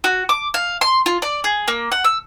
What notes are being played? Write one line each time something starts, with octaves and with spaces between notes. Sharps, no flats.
F#4
D6
F5
C6
F4
D5
G#4
A#3
F#5
E6